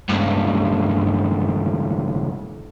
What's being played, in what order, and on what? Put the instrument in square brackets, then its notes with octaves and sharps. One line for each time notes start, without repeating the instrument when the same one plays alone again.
[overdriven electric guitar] C#2 G2